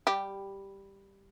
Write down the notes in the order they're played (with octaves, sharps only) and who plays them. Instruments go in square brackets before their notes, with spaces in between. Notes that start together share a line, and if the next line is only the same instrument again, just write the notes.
[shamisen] G3 G4